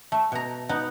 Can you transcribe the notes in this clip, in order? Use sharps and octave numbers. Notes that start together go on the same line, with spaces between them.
A3
B2 A#5
B3 D#4